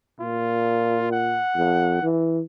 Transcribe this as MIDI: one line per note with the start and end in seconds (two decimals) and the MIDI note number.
0.20 1.42 46
0.20 1.12 65
1.12 2.07 78
1.57 1.99 41
2.02 2.41 52